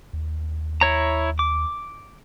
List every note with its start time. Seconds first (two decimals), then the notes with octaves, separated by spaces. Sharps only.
0.13 D#2
0.81 E4 C#5 A#5
1.39 D6